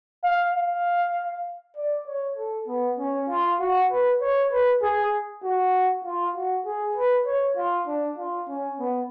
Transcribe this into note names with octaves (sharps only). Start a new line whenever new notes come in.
F5
F5
D5
C#5
A4
B3
C#4
F4
F#4
B4
C#5
B4
G#4
F#4
F4
F#4
G#4
B4
C#5
F4
D4
F4
C#4
B3